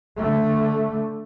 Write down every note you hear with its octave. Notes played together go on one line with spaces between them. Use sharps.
D3 A3